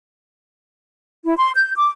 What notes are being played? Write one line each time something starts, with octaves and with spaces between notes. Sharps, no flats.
E4
C6
G6
D6